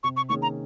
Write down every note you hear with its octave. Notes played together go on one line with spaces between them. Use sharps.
C3 C#6
C#6
D#3 A#3 C#4 G#4 C#6
A#5